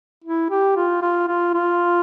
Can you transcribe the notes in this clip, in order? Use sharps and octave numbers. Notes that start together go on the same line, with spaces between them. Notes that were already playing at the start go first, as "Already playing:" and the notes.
E4
G4
F4
F4
F4
F4